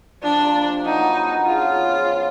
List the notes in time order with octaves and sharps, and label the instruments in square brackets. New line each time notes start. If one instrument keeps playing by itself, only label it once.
[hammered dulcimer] F3 [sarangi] D4
[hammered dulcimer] C3
A#3
C3
[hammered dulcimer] F#3 [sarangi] D#4
[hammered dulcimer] B3
D4
B3
[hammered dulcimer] C#3 [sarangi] F4
[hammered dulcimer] C#3
F3
C#3